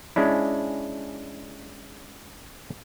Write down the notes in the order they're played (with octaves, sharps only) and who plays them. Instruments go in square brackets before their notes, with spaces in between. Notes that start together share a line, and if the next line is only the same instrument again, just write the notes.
[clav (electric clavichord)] G#3 C#4 D4 E4